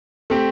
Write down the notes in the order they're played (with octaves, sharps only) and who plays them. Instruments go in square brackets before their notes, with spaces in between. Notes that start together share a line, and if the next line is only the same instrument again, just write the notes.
[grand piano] A3 C4 G4